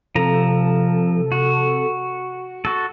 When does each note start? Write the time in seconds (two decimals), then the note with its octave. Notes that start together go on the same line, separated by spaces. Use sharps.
0.15 C3 F3 A4 A#5
1.32 F#4
2.65 F#4 A4